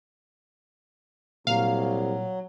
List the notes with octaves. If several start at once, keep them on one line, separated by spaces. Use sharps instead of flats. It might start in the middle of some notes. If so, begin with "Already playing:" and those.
C2 A#2 F#3 F5